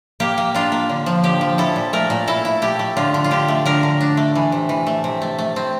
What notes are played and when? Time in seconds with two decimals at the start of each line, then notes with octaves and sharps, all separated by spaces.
0.20 A#3 G4
0.38 A#3
0.54 D4 F4
0.72 A#3
0.89 D3
1.06 F3
1.24 D3 G4
1.41 F3
1.58 E4 A4
1.76 A#2
1.93 A3 A#4
2.10 A#2
2.27 E4 A4
2.45 E4
2.62 A3 G4
2.79 A3
2.97 D3 F4
3.14 D3
3.24 F4
3.31 D3 G4
3.48 A3
3.65 D3 A#4
3.83 D3
4.01 D4
4.17 A3
4.35 E3
4.52 C3
4.69 E3
4.87 A3
5.04 C3
5.22 A3
5.38 A3
5.56 C4